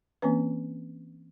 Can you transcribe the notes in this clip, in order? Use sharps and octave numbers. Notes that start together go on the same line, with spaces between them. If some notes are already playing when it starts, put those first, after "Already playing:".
E3 A#3 C4 C#4 B4